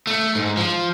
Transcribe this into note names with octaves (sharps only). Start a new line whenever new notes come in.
A3
G#2
F3